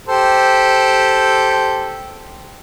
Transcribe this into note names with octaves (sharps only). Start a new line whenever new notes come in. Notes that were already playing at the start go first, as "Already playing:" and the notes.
G4 A4 C5